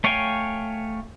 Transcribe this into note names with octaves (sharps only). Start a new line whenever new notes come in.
A3 C#5 F5 G5 G#5